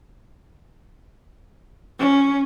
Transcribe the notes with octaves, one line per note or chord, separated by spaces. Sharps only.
C#4